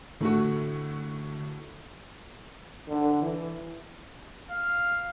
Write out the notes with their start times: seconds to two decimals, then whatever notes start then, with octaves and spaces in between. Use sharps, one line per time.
0.21 A2 D3 A3 F#4
2.88 D3
3.22 E3
4.51 F5